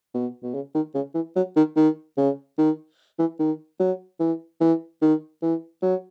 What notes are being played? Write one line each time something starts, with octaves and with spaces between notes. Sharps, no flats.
B2
B2
C#3
D#3
C#3
E3
F#3
D#3
D#3
C#3
D#3
E3
D#3
F#3
E3
E3
D#3
E3
F#3